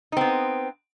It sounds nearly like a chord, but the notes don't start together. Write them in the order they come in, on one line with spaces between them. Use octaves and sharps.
D#4 C4 B3